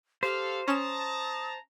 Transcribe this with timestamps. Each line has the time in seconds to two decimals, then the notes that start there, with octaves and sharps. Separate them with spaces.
0.23 G4 A4 C5 F5
0.68 C#4 A5 A#5 D#6 E7